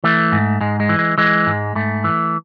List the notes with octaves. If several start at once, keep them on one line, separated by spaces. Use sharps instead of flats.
E3 A3
G#2
G#2 G#3
G#3
E3
G#3
E3 G#3
G#2
G#2 A3
E3